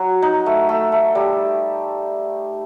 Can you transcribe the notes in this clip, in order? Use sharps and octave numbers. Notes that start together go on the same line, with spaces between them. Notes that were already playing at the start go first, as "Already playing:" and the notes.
Already playing: F#3 F#4
D#4
A3
A3
A3
G3